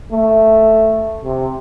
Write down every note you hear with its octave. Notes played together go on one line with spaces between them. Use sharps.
A3
C3